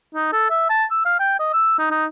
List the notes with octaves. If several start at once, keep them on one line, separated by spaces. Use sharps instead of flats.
D#4
A4
E5
A5
E6
F5
G5
D#5
E6
D#4
D#4